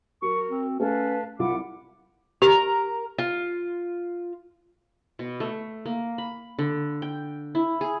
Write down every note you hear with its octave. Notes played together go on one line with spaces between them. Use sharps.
F#3 A#4 C#6
C4
A3 C#4 B4 F5 A5
C2 F4 F#5 B5 D6
G4 A#4 A#5
F4
B2
A3
A#3
B5
D3
G5
E4
G#4